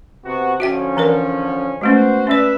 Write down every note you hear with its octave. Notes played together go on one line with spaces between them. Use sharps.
C3 B3 F#4
D3 F3 C#4 F#4 E5 G5
E3 A#4 D5
G#3 A3 B3 C#4 F#4 C5
C#4 B4 D5 E5